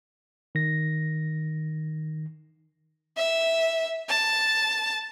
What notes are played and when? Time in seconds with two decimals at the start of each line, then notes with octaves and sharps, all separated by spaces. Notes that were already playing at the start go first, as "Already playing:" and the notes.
0.55 D#3 A#6
3.17 E5
4.09 A5